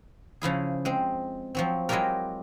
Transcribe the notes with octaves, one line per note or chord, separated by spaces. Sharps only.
C#3 F3 E4 G#4
G#3 C4
F3 F#3 C4
F#3 G#3 E4 F4 G4 A#4